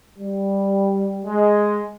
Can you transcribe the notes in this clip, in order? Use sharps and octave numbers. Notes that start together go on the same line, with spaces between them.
G3
G#3